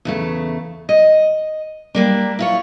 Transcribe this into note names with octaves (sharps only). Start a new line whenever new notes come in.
E2 C#3 A3
D#5
G3 A#3 D4
E4 F4 C#5